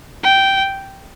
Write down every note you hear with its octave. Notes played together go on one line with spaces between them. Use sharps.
G5